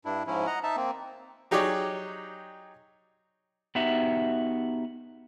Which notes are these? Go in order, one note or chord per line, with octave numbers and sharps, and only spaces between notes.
G2 D4 E4
G#2 F3 C#4 E4
D#5 F#5 A#5
D#4 E5 A5
A#3 C4
F#3 D#4 G4 G#4 C#5 D5
B3 D#4 F#4 G4 E5